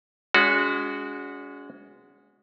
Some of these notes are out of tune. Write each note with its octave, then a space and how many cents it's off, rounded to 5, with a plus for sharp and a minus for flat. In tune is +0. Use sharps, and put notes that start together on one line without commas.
G#3 -10 C#4 +40 F#4 -10